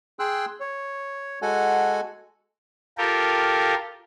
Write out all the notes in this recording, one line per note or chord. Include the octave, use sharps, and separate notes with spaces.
G#4 G5 C6 E6 F#6
C#5
G#3 F#4 A4 F#5 G#5
F4 G4 A4 A#4